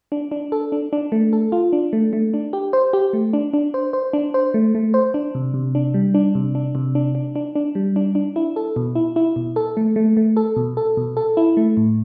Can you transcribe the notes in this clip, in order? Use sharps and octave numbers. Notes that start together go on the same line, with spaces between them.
D4
D4
A4
D4
D4
A3
A4
F4
D4
A3
A3
D4
G4
C5
G4
A3
D4
D4
C5
C5
D4
C5
A3
A3
C5
D4
C3
C3
D4
G3
D4
C3
D4
C3
D4
D4
D4
D4
G3
D4
D4
E4
A4
B2
E4
E4
B2
A4
A3
A3
A3
A4
B2
A4
B2
A4
E4
A3
A2